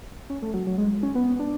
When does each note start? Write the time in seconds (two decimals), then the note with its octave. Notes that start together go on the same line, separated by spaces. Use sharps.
0.30 C#4
0.42 A3
0.54 F#3
0.67 F#3
0.78 G#3
1.03 C#4
1.15 B3
1.39 D4